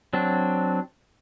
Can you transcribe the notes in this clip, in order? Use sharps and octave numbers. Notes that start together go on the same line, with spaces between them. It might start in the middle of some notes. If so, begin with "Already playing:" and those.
F#3 C4 D4